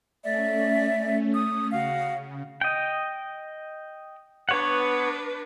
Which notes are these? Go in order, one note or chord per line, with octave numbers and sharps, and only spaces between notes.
A3 C#4 D5 E5
D#6
C#3 F#4 F5
D#5 G5
B3 D4 B4 C#5 F#5